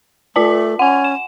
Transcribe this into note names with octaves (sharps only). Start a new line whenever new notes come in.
A3 F4 D5 A5
C#4 F#5 G#5
E7